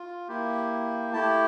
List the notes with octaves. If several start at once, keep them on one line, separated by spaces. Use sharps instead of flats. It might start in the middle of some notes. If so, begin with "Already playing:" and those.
Already playing: F4
A#3 E4 G4
A3 E4 G4 A5